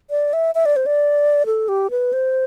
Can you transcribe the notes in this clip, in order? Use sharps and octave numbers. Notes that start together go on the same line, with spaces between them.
D5
E5
E5
D5
C5
D5
A4
G4
B4
C5